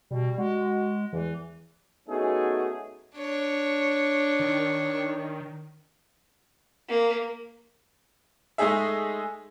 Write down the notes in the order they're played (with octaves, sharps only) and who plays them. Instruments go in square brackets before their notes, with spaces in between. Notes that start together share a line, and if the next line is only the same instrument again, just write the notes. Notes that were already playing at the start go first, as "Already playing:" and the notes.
[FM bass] B2 [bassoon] G3
[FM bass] G#3 [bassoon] F#4
[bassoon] E2 [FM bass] E3
[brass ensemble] A3 B3 C#4 D#4 F#4 G#4
[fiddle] D4 C#5
[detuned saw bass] D#3
[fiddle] A#3
[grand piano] G#3 A3 D#4 G#4 E5